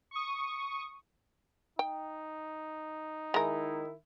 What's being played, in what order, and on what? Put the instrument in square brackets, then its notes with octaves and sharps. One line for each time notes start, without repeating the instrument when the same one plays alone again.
[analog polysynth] C#6 D#6
[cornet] D#4 [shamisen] G5
[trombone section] D#3 E4 [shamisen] G#3 A#4